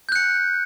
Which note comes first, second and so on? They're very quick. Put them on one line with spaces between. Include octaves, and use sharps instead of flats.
G6 F#6 C#7